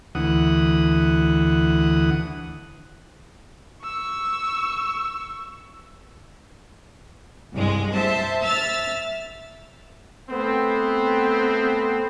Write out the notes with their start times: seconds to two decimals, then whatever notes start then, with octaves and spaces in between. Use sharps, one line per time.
0.15 D2 E3 F#5 D#6
3.84 C#6 E6
7.54 C2 G2 G#3
7.94 C5 E5 A5
8.43 E5 E6 F6 A6
10.31 A3 B3 C4